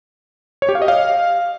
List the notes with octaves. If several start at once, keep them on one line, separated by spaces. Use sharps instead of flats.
C#5
G4
F5
D#5
F5